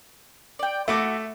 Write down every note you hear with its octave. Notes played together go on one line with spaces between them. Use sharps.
D5 G5
A3 E4 F#4 F#5 D6